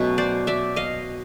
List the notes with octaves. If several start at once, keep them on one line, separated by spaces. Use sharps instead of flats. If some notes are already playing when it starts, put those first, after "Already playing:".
Already playing: B2 F#3 A3 C#4
C5 D5
D5 E5
D#5 F5